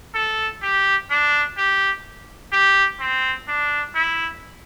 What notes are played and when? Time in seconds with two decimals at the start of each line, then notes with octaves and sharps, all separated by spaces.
0.14 A4
0.63 G4
1.10 D4
1.57 G4
2.52 G4
3.00 C4
3.48 D4
3.95 E4